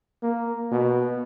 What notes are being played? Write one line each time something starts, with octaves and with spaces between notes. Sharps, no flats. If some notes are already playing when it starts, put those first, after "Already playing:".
A#3
B2